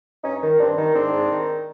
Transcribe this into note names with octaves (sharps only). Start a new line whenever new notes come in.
G2 C#4 D#4
D#3
G2 C4 D4
D#3
G#2 C4 D4
G#2
D#3